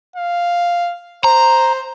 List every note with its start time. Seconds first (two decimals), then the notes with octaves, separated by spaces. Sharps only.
0.16 F5
1.24 C5 A#5